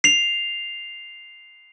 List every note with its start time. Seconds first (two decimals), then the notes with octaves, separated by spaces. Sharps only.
0.04 C7 F7